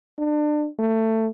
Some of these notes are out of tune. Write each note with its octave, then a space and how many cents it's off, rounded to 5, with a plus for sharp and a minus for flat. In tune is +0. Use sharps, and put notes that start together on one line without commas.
D4 +30
A3 +20